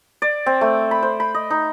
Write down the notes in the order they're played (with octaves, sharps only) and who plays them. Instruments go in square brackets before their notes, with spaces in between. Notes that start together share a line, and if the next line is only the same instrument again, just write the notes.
[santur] D5
C4
A3
B5
C5
B5
D#5
D#4